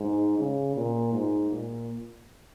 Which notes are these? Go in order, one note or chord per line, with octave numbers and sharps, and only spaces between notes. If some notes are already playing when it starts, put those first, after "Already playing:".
Already playing: G#2
C#3
A#2
G#2
A#2